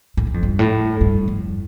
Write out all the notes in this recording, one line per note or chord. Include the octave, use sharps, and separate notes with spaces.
A2
G2
F2
G2
A2
G2
F2